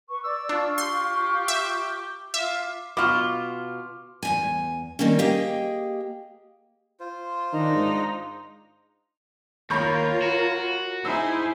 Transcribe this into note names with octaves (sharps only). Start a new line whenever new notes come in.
B4 C#6
D5 D6 E6
D4 F4 C#6
G4 C6
E5
F4 E5 D6
B2 F4 D6 F6
E2 G2 G#5
D#3 G3 A#3 C4 C#4
A#3 G4 G#4 D#5 G5
F4 C5
D#3 D4 D#4 A#5
G#2
D#2 F4 A#4 C#5 B5 C#6 G6
F#4
D#4 E4 G#4 C5 E6